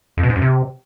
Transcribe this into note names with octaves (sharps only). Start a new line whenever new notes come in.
F2
B2
G#2
F#2
C3